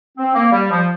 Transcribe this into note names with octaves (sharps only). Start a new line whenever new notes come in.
C4
A#3
G3
F3